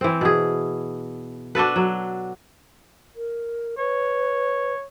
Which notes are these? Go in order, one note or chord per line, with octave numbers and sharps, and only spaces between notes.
E3 C4
B2 G#4
D4 F#4 A4 B4
F#3
A#4
B4 C#5